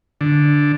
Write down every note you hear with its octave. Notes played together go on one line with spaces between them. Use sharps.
D3